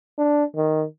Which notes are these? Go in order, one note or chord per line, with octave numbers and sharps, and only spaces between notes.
D4
D#3